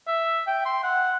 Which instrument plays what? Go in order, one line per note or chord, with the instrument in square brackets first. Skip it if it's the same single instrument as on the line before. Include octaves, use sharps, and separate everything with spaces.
[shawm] E5
G5
C6
F#5